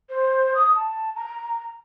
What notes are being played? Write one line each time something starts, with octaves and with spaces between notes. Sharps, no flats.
C5
D#6
A5
A#5